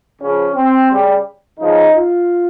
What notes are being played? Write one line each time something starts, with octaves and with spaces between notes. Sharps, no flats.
C#3 F3 C#4
C4
C#3 G3
C#3 F3 D#4
F4